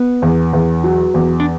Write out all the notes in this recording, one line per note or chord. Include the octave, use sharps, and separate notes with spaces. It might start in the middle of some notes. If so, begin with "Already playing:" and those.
Already playing: B3
E2
E2
F#3
E2
D4